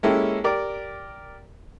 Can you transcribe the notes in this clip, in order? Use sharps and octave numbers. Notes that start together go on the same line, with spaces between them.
G#3 A#3 C#4 E4 G4 A4
G4 A#4 D5